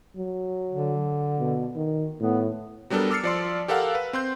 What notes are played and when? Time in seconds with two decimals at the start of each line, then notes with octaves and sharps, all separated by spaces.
0.17 F#3
0.70 D3
1.39 B2
1.76 D#3
2.20 A2 B3
2.90 F#3 G3 B3 D4 A4 A#4
3.11 D6 E6 F6 A6 C7 C#7
3.23 F3 D5 C6
3.68 G4 A4 A#4 F5 F#5 E6
3.95 B4
4.13 C4 C6 G6